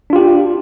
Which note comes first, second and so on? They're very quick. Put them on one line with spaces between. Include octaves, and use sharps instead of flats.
D4 F4 G4